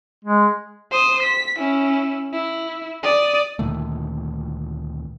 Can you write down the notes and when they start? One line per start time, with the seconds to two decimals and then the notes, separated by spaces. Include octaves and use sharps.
0.25 G#3
0.92 C5 D#6
1.23 B6
1.58 C#4 E4
2.33 E4
3.03 D5 D#6
3.59 D2 A#2 D#3 A3